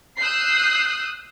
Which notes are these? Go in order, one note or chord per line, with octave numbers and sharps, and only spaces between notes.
D#6 E6 F#6 G6 C7